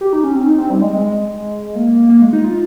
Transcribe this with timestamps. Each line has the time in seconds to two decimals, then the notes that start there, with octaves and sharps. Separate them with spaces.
0.01 G4
0.13 D#4
0.24 C#4
0.35 C4
0.47 D#4
0.58 C4
0.70 G3
0.82 G#3
0.93 G#3
1.75 A#3
2.09 A#3
2.22 G#3
2.33 D#4
2.44 F4